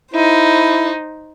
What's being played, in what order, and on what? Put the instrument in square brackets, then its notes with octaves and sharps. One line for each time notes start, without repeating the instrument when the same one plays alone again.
[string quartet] D#4 C5 [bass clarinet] E4